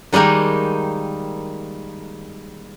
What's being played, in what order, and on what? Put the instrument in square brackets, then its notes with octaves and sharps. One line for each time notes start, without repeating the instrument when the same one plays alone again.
[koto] D#3 G3 G#3 A#3 D#4